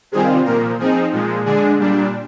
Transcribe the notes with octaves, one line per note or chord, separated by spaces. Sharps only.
C3 D#3 G3 C4 F4 G#4
A#2 F3 A#3 A#4
F3 C4 D#4 G#4
A#2 F3 G#3
D3 G#3 D4 G#4
A#2 G3 D4